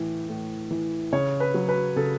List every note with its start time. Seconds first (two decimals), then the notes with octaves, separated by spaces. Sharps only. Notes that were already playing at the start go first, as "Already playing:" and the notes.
Already playing: A2 E3
0.29 A2
0.71 E3
1.12 C#3 C#5
1.40 B4
1.54 F#3
1.69 B4
1.96 C#3 A4